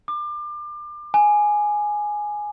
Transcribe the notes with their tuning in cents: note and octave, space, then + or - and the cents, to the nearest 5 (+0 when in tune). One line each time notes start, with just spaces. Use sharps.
D6 +30
G#5 +5